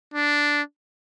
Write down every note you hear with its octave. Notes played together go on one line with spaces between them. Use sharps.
D4